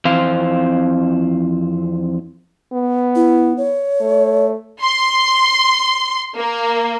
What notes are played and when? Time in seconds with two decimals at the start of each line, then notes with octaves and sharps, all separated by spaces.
0.05 F2 E3 C4 C5 F5
2.73 B3
3.16 E4
3.57 C#5
4.01 A3
4.83 C6
6.36 A#3